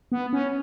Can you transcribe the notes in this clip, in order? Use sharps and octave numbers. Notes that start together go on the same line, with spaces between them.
B3
C#4